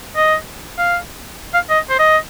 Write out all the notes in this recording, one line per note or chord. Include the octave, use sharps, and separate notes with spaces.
D#5
F5
F5
D#5
C5
D#5